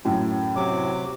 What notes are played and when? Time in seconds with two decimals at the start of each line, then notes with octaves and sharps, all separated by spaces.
0.05 F#2 A2
0.56 C3 F#3 D6